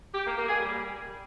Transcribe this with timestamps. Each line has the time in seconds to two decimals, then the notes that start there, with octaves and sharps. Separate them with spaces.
0.14 G4
0.26 A#3
0.37 A#3
0.49 G#4
0.60 G3